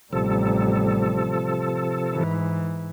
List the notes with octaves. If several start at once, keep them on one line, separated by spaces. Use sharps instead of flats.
A1 C3 F3 G3 A4
G#2 E3